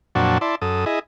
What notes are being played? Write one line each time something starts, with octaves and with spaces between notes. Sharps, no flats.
F2 A#2 F#3 D4 F#4 A5
E4 D5 A5 C6
F#2 A4 D#6
E4 G#4 D#5